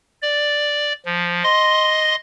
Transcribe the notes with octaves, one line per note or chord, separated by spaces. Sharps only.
D5
F3
D#5 C6